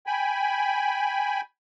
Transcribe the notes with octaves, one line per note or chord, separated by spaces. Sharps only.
G5 G#5 B5